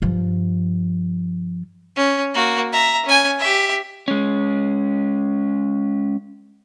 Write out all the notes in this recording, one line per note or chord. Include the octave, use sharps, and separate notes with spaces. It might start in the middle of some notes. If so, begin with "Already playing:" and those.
G2 F3
C#4
A#3 F#4
E5 A#5
C#4 G#5
G4 E5
G#3 C#4